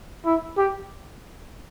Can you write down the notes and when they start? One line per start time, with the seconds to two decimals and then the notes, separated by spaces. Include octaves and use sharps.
0.25 E4
0.58 G4